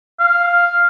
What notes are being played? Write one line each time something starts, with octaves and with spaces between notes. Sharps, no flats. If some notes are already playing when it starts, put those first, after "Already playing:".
F5